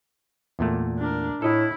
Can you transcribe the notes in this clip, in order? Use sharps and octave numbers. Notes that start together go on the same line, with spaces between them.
E2 A#2 A3
D4 A#4
A2 E4 A4 D#5